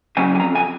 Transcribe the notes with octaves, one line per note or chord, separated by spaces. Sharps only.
C#3 F#3 C#4 G#5
G#5
F2 A#5
G#5